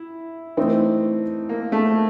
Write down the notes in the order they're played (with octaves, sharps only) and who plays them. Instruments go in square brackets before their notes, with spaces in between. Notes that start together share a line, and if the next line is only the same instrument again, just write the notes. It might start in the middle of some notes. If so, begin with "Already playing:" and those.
Already playing: [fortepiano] E4
[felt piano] E3 A3 C4 D#4
[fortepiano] A#3
A3